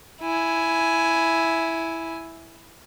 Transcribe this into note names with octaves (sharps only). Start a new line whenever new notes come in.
E4 G#5